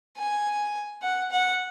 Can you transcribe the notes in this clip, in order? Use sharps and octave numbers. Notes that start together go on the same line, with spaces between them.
G#5
F#5
F#5